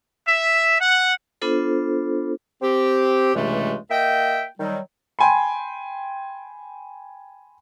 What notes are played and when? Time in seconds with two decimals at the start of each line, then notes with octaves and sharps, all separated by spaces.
0.25 E5
0.78 F#5
1.42 B3 D4 F4 A4 C5
2.62 C4 G4
3.35 C#2 G2 C3 E3 G#3 A3
3.91 A#3 D#5 E5 G5
4.59 D#3 F#3 G3
5.19 G5 G#5 B5 C6